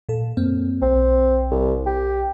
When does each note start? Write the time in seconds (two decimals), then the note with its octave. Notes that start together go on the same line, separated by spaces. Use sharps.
0.09 A#2 A4
0.37 F#2 A#3 C4
0.82 B1 C4
1.51 C2
1.86 G4